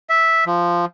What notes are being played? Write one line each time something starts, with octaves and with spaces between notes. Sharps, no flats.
E5
F3